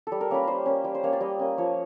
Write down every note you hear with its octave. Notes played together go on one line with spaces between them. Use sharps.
G3 A4
A#4
A#3 C#4 B4
G3 C5
A#3 C#4
G3
C5
A#3 C#4 C#5
D5
G3 D#5
A#3 C#4
F3 C#5